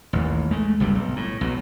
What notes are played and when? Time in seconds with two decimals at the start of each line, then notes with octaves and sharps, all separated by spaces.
0.13 A1 D#2
0.51 G#3 A3
0.80 F#1 G2 C3 G3
0.95 B1
1.16 A2
1.41 B1 C3 F#3